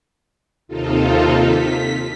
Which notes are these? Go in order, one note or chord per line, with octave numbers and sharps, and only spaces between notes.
D#2 C3 D#4 F4 A4
B6